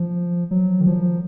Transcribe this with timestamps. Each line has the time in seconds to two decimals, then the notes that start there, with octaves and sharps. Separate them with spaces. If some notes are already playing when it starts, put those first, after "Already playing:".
Already playing: F3
0.51 F#3
0.81 D#3
0.87 F3